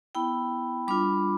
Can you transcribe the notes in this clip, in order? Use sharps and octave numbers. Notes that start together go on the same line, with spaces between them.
B3 E4 G5 B5
G3 D4 F4 B5 D6